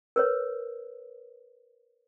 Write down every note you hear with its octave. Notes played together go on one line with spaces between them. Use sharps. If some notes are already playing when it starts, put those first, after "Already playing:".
A#4 B4 C#5